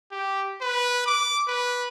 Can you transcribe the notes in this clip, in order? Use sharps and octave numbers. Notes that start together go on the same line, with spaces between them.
G4
B4
D6
B4